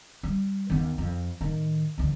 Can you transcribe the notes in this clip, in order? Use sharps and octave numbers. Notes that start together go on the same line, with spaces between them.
G3
D#2 B3
F2
A2 D#3
D2 E3